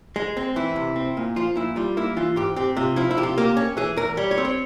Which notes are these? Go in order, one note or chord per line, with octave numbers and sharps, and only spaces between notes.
G#3
C4
E3 E4
C3
C4
A#2
F3 F4
A#2 E4
G3 F4
A#3 E4
E3 F4
G#2 G4
C4 G4
C3 F4
F3 E4
E4
C3 G4
F4
A#3 G4
C#4
E3 G#4
E2 A#4
G3 C#5
C#5
C4
C#5